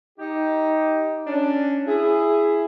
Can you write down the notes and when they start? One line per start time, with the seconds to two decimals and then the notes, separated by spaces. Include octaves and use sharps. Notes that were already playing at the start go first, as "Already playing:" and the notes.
0.19 D#4 G4
1.27 C#4 D4
1.87 E4 G#4